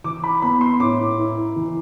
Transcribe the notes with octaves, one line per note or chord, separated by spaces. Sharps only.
E3 D6
B5
B3 B5
C6
A2 D6
E4
E3